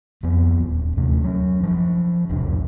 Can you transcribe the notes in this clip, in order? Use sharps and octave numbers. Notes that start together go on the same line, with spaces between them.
F2 F3 B3
D#1
D#2 C3 A3
F#3 C#4
F3 C#4 D4
E1 C2 F2 D4